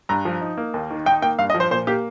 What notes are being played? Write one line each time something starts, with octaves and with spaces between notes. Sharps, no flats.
G2 A#5
F3
D#4
A#3
D#2
D#3
D#4 G5
A#3 G5
G2 F5
D#5
F3
C5
A#2 C5
A#3 G4